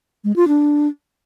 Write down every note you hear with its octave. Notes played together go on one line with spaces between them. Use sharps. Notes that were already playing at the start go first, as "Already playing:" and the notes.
G#3
F4
D4